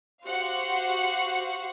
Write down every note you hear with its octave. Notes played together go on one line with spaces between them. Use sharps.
F#4 G4 C5 F5 F#5 C#6